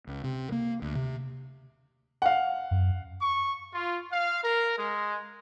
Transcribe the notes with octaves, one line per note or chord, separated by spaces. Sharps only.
C#2
C3
A#3
D2
C3
F5 F#5
F#2
C#6
F4
F5
A#4
G#3